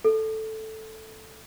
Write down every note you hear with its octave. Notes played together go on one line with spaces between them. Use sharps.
A4